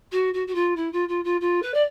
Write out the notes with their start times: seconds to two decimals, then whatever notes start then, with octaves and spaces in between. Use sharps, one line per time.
0.12 F#4
0.33 F#4
0.47 F#4
0.54 F4
0.76 E4
0.92 F4
1.08 F4
1.24 F4
1.40 F4
1.62 B4
1.74 D5